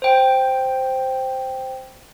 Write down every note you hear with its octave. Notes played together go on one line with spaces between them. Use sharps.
C5 G5